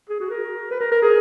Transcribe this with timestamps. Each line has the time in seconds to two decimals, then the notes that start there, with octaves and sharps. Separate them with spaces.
0.10 G#4
0.20 F#4
0.30 A#4
0.71 B4
0.81 A#4
0.92 A#4
1.02 G#4